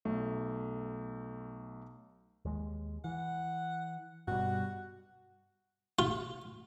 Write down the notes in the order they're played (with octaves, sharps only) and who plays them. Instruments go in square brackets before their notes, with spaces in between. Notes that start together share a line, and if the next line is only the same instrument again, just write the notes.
[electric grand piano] B1 A3
[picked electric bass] D#2 G#3
[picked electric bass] E3 [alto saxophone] F#5
[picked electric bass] G2 B2 G3 [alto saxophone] F#4
[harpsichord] F4